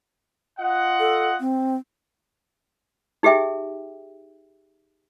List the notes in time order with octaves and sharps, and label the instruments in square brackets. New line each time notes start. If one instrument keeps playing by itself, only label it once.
[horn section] F4 D#5 F#5
[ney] A4
C4
[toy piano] D#4 G4 G#4 E5 G5